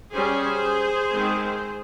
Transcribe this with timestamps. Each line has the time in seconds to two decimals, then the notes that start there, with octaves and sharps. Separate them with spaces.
0.12 G3 C#4 G#4 C5
1.11 D#3 G#3 C4